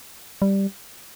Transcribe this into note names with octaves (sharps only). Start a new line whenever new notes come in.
G3